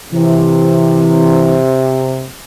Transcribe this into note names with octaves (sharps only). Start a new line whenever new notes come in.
C3 E3